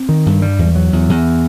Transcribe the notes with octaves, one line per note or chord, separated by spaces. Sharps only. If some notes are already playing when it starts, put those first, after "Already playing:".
Already playing: C4
D#3
G2
G3
E2
F#3
E2
E2